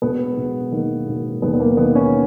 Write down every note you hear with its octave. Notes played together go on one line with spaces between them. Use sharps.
E1 B3
E1
D#3 A#3
E1
D#2 B3
B3
A#3
D#3 B3
C#4